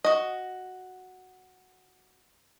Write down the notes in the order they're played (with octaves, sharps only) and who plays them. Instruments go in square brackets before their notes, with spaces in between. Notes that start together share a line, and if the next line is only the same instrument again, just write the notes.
[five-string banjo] F#4 D#5